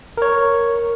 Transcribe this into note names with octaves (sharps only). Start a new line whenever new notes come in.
A#4 C#5